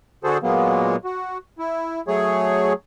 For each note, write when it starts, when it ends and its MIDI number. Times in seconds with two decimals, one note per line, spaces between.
0.24 0.38 50
0.24 0.38 66
0.24 0.38 68
0.24 0.38 69
0.24 0.38 72
0.43 0.96 46
0.43 0.96 54
0.43 0.96 56
0.43 0.96 58
0.43 0.96 59
1.05 1.38 66
1.58 2.02 64
2.08 2.73 54
2.08 2.73 57
2.08 2.73 68
2.08 2.73 73